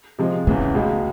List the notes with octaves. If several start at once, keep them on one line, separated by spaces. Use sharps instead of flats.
C3 F3 G#3
E2 C#3 E3 A3
C#2 B2 G#3